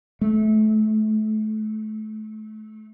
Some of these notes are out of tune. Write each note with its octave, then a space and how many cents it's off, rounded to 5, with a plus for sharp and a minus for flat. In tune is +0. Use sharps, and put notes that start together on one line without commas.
A3 -30